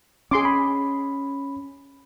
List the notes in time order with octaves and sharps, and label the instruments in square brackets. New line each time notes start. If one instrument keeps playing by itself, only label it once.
[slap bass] C#4 [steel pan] G#4 C6 D6
[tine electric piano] B5